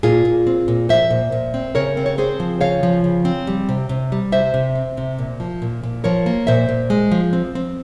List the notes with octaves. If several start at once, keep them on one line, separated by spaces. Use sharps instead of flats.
A#2 F4 G#4
A#2
C4
A#2
F3 C5 E5
A#2
A#2
C4
C#3 A#4 C#5
C4
C#5
C4 G#4 C5
F3
C#3 C#5 F5
F3
C#3
C4
G3
C3
C3
G3
C3 C5 E5
C3
C4
C3
A#2
F3
A#2
A#2
F3 A#4 C#5
A#3
A#2 C5 E5
A#2
G#3
F3
C4
C4